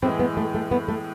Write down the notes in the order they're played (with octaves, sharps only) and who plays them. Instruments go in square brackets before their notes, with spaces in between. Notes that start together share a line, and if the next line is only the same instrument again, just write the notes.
[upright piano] A2 E3 G#3 [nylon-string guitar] C4
[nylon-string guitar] B3
A3
A3
B3
A3